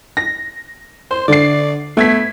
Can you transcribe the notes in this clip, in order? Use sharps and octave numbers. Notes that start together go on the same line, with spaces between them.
A#6
C5 C6
D3 D5 C7
A3 B3 G#6 B6